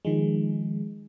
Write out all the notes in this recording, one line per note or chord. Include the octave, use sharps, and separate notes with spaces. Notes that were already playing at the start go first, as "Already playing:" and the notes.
D#3 F3 G#3